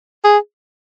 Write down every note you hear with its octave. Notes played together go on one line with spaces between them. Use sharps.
G#4